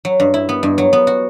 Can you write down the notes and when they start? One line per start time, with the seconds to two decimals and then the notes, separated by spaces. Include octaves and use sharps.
0.05 F#3
0.20 G2
0.34 E4
0.49 B3
0.63 G2
0.78 F#3
0.93 B3
1.07 F#4